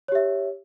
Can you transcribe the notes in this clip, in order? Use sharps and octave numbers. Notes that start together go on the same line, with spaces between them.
G4 C#5 E5